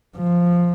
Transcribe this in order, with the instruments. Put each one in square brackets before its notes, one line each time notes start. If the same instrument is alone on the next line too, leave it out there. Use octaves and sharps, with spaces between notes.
[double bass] F3